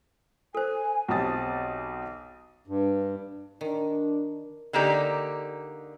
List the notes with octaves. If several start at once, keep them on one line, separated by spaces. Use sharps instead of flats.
A4 C5 G#5
B1 C4 G4 A5 D#6 A6
G2
D#3 D4
D3 A#3 D#4 G4 D5